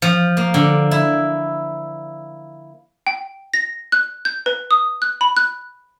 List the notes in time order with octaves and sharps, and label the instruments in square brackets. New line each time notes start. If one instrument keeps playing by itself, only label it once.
[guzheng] F3
A#3
D3
E4
[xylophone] G5
A#6
F#6
G6
B4
D#6
F#6
B5
F#6